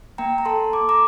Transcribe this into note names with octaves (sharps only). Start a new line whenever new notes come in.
A#3 G5 A#5
A#5
A4 A5 C6
A#3 D6
A#5 D6